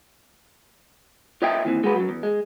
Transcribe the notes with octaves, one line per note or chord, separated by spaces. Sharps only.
F4 C#5 D#5 E5 G5
D#2 E3 C4
G#3 F#4 B4
F#2 F#3
E2
G#3